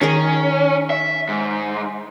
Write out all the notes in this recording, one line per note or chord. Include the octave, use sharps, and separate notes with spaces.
D#3 C#4 G#4 A#4
E5
G#2